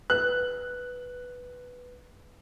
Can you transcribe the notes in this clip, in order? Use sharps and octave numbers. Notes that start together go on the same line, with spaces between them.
B4 F#6